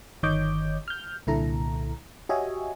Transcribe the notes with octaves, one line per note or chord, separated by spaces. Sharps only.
G1 D#3 C#5 D#5 D6 G6
F6 G6
C2 A#2 D3 E4 A4 A#5
F#4 G4 C#5 D#5 E5 G#5